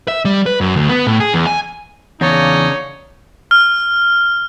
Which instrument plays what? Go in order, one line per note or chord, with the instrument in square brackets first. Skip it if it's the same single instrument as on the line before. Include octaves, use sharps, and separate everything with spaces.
[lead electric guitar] E5
G3
B4
F#2
D2
B3
A2
G#4
E2
G#5
[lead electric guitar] E2 [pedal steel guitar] C#3 A#3 D4 [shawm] D#4 [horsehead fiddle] C#5
[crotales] F6